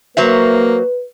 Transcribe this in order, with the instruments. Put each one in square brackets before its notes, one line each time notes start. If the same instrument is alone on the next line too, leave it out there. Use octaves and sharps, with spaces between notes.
[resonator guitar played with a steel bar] F#3 C5 E5 [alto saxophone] A#3 [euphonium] B4